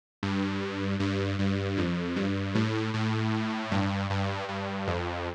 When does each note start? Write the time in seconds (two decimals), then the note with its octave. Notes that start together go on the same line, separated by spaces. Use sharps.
0.23 G2
1.00 G2
1.39 G2
1.78 F2
2.16 G2
2.55 A2
2.94 A2
3.71 G2
4.10 G2
4.49 G2
4.88 F2